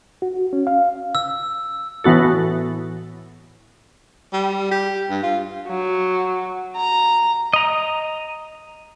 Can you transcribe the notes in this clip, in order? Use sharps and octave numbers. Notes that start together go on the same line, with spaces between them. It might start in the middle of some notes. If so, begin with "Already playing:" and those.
F#4
C#4
F5
E6
A2 E3 B3 F#4 A4
G3
G4
G2
F4
F#3
A#5
D#5 A#5